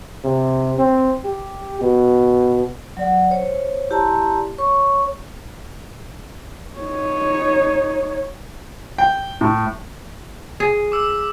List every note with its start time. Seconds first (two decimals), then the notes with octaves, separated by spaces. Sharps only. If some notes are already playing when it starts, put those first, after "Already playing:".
0.24 C3
0.78 C4
1.25 G4
1.81 B2
2.97 F#3 D5 F#5
3.30 C5 C#5
3.90 E4 G4 D5 A5 A#5 C6
4.58 C#5 C#6
6.79 D#4 C#5
8.98 G5
9.41 A2
10.60 G#4
10.92 D6 E6